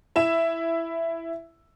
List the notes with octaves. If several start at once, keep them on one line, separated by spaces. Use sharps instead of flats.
E4 E5 E7